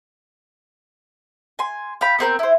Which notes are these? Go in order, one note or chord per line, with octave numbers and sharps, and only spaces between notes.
G#5 C6
F5 G5 B5
B3 C4 A#4 G6
E4 C5